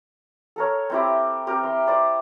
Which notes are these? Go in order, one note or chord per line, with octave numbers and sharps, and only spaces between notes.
A4 A#4 C#5
C4 E4 G4
C4 G4 A#4
C4 C6
C5 D5 B5